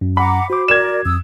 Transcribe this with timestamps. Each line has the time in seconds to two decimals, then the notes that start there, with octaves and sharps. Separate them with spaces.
0.01 F#2
0.17 F#5 A#5 B5 D6
0.50 F#4 C5 D6
0.68 A#4 D5 G#6 E7
1.06 F2 D#6 E6